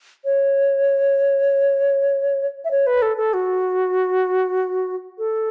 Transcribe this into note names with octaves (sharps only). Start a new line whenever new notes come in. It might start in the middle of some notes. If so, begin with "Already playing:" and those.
C#5
E5
C#5
B4
A4
A4
F#4
A4